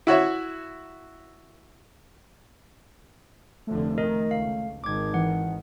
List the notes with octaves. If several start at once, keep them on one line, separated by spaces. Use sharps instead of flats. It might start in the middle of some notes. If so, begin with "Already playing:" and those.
E4 F#4 C#5 E5
F1 D3 F3 A3
D#3 A#4 D#5
C#2 F5
G#1 D#3 D6 G#6
E3 F#5